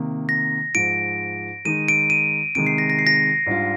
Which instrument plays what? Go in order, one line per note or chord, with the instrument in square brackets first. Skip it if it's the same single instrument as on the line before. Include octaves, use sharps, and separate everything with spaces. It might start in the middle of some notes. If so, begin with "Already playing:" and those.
Already playing: [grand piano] C3 D#3 A#3
[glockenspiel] A#6
[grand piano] G#2 F3 G#3 [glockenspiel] D7
[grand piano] D#3 G#3 D#4 [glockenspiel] D#7
[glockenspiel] D7
D#7
[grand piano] C3 D#3 G#3 D#4 [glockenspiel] D7
[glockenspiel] C7
A#6
A#6
C7
A#6
[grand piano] G#2 G3 D4 F4